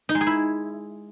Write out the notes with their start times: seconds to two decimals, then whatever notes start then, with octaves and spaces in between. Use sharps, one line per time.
0.09 D#4
0.15 G#3
0.21 G#4
0.27 E4